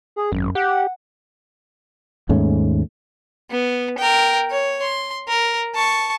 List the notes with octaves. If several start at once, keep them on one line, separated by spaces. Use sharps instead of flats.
G#4
G#1 F#2
G4 F#5
D#2 G#2 A3 C#4
B3
A#4 G5
C#5
C6
A#4
A5 C#6